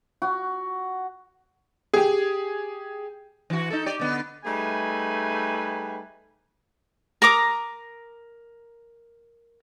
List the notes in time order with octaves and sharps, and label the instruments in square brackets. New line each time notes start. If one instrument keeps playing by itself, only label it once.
[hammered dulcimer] F#4
[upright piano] G4 G#4
[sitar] E3 F#4
D#4 A4
G4 D5 D#5
D3 B3
[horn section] G3 A3 D#4 G#4 B4 G#5
[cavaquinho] A#4 A#5 D6 D#6